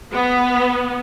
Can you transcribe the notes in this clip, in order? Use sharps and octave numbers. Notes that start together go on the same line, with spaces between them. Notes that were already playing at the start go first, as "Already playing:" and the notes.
B3